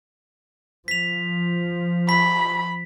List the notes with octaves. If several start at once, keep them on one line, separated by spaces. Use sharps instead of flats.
F3 B6 F7
B5 B6